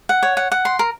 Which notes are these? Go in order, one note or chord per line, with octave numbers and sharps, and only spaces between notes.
F#5
C#5
F#5
F#5
C6
A#4